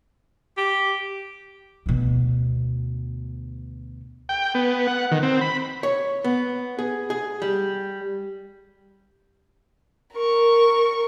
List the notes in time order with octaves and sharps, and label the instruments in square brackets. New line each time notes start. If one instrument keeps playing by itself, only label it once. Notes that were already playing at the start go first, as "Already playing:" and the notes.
[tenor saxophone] G4
[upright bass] D2 B2
[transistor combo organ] G5
B3
F#5
D#3
C4
B5
[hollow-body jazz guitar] C#5
B3
G#4
G#4
G3
[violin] A#4 C#6